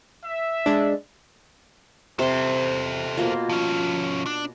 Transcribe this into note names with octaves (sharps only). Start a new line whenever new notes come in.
E5
G#3 D4
C3 A4 C5 G5
B2 A#3 F4
F3 C#4
D4